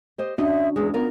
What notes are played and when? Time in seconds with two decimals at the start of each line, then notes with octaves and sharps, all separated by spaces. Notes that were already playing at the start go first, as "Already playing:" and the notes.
0.18 G4 C5 D#5
0.38 C#4 D4 F#4 D#5 E5
0.76 E2 G#3 G#4
0.94 B3 F4 A#4